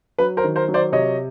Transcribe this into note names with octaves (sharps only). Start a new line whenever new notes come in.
F#3 B4
A#4 C5
D#3
A#4 C5
F#3
C5 D5
C3 C#5 D#5